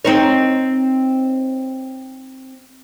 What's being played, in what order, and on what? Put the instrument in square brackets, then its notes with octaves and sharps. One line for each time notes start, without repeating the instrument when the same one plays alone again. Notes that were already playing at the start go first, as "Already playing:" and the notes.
[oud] C4 D#4 C#5